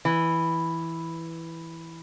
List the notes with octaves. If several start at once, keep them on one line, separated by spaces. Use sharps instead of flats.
E3